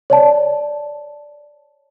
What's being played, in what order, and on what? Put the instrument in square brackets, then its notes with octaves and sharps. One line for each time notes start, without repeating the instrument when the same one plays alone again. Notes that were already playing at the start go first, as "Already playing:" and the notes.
[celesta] C#5 D5 A5